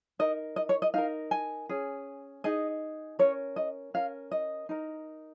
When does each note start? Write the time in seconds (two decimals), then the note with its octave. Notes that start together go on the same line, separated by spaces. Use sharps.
0.19 D#4 A#4 D#5
0.56 D#5
0.69 C#5
0.82 D#5
0.94 D#4 A#4 F5
1.31 G#5
1.69 C#4 G#4
2.44 D#4 G#4 D#5
3.19 C#4 A#4 C#5
3.56 D#5
3.94 C#4 A#4 F5
4.31 D#5
4.69 D#4 A#4